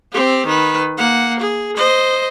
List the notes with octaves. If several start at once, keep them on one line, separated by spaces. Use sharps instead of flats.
C4 G4
D#3 B4
A#3 F#5
G#4
C5 D#5